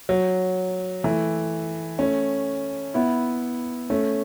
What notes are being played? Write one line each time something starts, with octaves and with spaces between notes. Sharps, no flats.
F#3
E3 A3
A3 C#4
B3 E4
A3 C#4